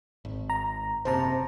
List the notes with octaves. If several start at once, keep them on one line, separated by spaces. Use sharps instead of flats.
G#1
A#5
F#1 C3 C5 A5 A#5